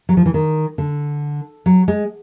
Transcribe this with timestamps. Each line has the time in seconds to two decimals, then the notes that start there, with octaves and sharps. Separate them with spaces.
0.09 F#3
0.17 F3
0.26 E3
0.34 D#3
0.78 D3
1.66 F#3
1.88 G#3